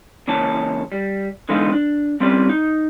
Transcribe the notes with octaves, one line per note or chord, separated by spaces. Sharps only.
C#3 E3 A#3 C#5 A5
G3
D3 E3 G#3 B3 D#4 F5
D4
G3 C4 C#4 G4 B4 D5
D#4